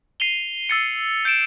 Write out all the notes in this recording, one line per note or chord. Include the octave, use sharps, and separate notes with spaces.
C7 D#7 F7 G7
E6 A6 C#7
G6 C#7 D7 E7